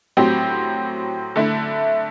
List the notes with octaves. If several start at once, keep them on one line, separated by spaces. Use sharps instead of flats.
A2 F#3 C4 G4
D3 A3 E4